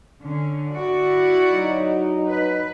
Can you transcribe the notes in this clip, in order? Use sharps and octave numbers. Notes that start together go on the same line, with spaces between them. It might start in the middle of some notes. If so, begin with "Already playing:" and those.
D3 C#4
E4 F#4 D5
F#3 D#4
B4